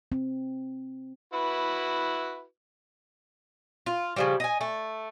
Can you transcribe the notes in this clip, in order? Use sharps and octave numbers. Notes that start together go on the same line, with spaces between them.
C4
E4 F#4 B4
F4
C#3 F3 G3
D#5 G#5
A3